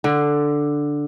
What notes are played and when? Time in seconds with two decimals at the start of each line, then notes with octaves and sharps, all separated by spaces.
0.04 D3